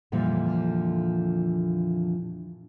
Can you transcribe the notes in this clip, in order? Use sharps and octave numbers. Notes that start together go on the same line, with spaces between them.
F2 A#2 D3 E3 F3 G3